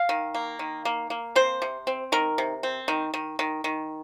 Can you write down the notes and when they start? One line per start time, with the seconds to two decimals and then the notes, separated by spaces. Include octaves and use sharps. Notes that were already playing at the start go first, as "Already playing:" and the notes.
Already playing: F5
0.09 D#3
0.34 A#3
0.59 D#3
0.85 A#3
1.10 A#3
1.35 C4 C5
1.62 C3
1.87 C4
2.12 D#3 A#4
2.38 C3
2.63 C4
2.88 D#3
3.14 D#3
3.39 D#3
3.64 D#3